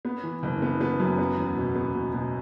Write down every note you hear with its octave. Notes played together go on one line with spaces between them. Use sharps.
B3
E3
F#1
B3
B3
F#2
B3
E2
B2
B3
B2
B2